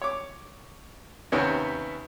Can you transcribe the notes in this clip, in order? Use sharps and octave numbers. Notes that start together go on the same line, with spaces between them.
C#5 D6
D#2 C3 B3 C#4